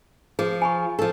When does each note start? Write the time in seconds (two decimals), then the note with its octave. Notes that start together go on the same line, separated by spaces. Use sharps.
0.39 F3 G#4
0.62 G#5 B5 C#6
0.99 F3 A4